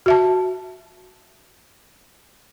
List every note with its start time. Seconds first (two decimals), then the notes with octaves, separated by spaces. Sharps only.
0.06 F#4 E5 A5